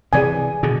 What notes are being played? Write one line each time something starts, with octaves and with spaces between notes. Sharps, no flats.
C3 E3 G#4 D5 G#5
B2 D3 G#4